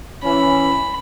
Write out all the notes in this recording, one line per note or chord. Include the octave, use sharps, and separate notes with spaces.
E3 C#4 B5